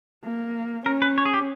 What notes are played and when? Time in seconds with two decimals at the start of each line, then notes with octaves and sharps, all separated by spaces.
0.24 A#3
0.86 C#4 A#4
1.02 B4
1.18 C#5
1.25 G#4
1.34 G4